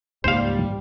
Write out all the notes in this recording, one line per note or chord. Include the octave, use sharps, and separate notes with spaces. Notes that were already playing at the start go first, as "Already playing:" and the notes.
C#2 G#2 G3 A#3 C5 F5